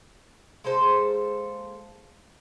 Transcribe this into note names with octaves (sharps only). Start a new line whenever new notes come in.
G#3 A#3 A4 C5